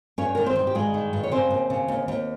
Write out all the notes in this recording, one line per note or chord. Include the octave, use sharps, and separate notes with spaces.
G2 C#4 C#5
D#3 A#4
C4 C5
D#3
G4
G2 G#3 G#4
D#3
G2
C#5
C#3 C4 C5
D#2
C#3
D#2
D#2